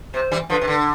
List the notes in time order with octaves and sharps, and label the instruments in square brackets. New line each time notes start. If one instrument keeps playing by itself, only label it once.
[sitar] C3 [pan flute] C5
[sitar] E3 G3
[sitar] D3 F3 [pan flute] B4
[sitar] C3
D3